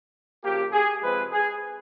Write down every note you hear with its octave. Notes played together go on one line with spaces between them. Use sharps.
C#3 F3 A#3 G4
G#4
C3 F3 G#3 C4 B4
G#4